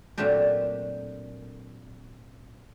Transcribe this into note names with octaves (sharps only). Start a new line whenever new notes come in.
A#2 F#3 A3 C4 D4 G4